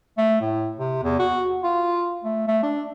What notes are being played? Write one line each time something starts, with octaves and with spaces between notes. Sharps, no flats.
A3
A2
C3
E2
F#4
F4
A3
A3
D4